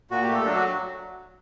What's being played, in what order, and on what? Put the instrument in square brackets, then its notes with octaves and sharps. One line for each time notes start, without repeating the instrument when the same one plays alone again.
[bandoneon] A#2 F#4
G4
A3
A4
F#3 D4
F#4